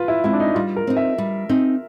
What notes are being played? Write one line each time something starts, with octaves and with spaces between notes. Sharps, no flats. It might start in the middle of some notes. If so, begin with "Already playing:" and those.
Already playing: F4 B4
E4
G#3 C4 E4
D4
D#4
G3 F4
A#4
C4 D#4
E5
G3
C4 D#4